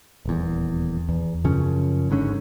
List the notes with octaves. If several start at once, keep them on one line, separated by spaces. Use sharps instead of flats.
D#1 E2
E2
F#2 C#3 F3 C#4
G#1 G#2 D3 C#4